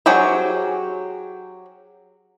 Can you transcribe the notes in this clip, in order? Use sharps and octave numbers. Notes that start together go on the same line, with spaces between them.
F#3 C#4 G4 G#4 C5